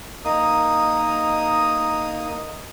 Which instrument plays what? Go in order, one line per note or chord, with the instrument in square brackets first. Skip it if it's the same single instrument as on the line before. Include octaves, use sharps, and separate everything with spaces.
[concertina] A#3 D#4 D#6